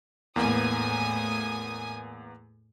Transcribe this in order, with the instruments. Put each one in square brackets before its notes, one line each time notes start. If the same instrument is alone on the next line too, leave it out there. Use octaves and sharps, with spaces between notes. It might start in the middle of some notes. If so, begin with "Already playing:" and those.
[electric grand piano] E2 A#3 B3 [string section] A2 G#5 D#6